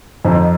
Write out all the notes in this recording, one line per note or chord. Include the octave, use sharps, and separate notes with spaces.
F2 D#4